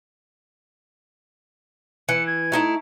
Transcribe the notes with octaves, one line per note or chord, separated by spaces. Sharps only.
E3 C#7
G#6
A3 D#4 E4